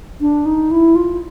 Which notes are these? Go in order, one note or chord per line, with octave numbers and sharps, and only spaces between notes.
D4
D#4
E4
F4